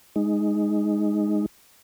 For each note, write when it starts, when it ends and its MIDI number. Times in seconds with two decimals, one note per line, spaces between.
0.16 1.46 56
0.16 1.46 63